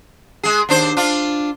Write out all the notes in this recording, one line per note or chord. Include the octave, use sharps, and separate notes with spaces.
G#3 G#4
D#2 D4 C5
D4 F4